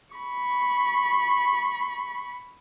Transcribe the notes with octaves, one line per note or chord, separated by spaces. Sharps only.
B5 C#6